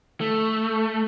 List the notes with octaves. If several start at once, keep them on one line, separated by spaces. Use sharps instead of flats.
A3